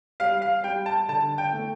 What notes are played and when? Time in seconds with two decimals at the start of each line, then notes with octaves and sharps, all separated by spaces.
0.20 G3 F5
0.42 F5
0.64 G3 G5
0.86 A5
1.08 D3 A5
1.38 G5
1.53 A3